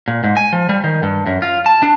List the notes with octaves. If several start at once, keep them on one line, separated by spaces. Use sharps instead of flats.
A#2
G#2
G#5
F3
G3
D#3
G2
F#2
F4
A5
D4